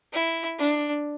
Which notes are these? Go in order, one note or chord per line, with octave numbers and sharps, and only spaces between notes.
E4
D4